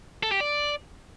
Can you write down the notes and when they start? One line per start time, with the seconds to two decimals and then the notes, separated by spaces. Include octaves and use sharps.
0.23 A4
0.32 G4
0.40 D5